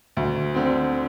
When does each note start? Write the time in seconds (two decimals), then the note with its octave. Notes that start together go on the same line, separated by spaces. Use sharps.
0.17 D2
0.54 D3 C4